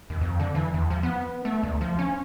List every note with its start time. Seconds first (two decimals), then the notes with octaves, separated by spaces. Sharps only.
0.10 D#2
0.21 F2
0.40 D3
0.55 E3
0.74 E2
0.90 F3
1.03 B3
1.45 A3
1.63 D2
1.81 F3
1.99 C#4